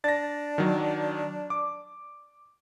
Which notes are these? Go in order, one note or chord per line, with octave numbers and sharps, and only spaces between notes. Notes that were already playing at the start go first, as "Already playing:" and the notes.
D4 A6 A#6
D#3 F#3
D6